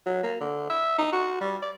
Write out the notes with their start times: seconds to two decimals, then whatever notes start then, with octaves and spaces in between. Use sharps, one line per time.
0.06 F#3
0.23 A#3
0.40 D3
0.70 E5
0.98 D#4
1.12 F#4
1.41 G3
1.62 D5